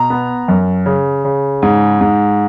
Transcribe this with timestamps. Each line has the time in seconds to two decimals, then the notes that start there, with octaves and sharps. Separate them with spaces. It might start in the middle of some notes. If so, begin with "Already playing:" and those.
Already playing: B2 A#5
0.10 B3
0.48 F#2
0.86 C#3
1.25 C#3
1.62 G#2
2.01 G#2